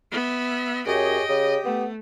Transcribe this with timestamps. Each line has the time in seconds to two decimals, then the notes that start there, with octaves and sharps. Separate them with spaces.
0.11 B3 E5
0.87 F#2 G4 G#4 C#5 D#5 G5
1.28 C#3 G4 D#6
1.65 A3 B3